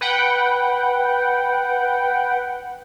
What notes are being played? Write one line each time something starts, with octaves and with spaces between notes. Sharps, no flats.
B4 F#5 G5